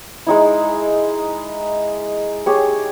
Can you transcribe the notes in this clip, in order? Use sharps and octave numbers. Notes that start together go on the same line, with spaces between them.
G#3 D#4 E4
G4 G#4 C#5